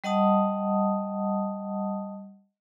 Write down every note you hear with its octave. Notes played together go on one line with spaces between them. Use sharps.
G3 D#5 F#5 A5 D#6